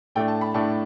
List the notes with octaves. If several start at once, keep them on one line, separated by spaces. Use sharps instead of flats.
A2 A3 D4 G5
A5
B5
A2 A3 D4 A5